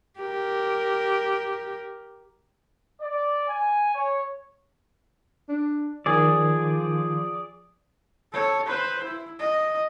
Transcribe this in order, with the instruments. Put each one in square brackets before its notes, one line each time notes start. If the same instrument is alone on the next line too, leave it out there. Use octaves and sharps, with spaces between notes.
[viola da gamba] G4 A#4
[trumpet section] D5
G#5
C#5
[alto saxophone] D4
[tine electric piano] D#3 [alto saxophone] F3 [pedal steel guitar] G#4 D5
[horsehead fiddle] A4 C#5
B4 C5
E4
D#5